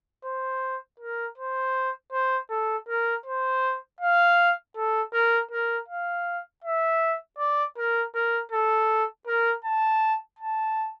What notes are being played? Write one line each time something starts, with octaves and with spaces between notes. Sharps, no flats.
C5
A#4
C5
C5
A4
A#4
C5
F5
A4
A#4
A#4
F5
E5
D5
A#4
A#4
A4
A#4
A5
A5